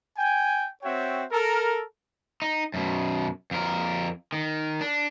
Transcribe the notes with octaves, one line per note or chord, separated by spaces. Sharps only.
G5 G#5
C4 F#4 C#5 E5 G5
A4 A#4
D#4
F#2 B2
F2 A#4
D#3
D4